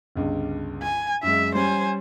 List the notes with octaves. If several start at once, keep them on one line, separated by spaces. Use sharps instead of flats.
G1 C#2 G2
G#5
F#2 G#3 E5
G3 C#4 C5 C#5 G#5